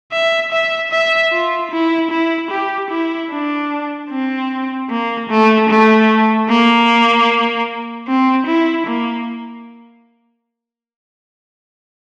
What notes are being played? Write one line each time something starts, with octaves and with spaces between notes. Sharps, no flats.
E5
E5
E5
F4
E4
E4
G4
E4
D4
C4
A#3
A3
A3
A#3
C4
E4
A#3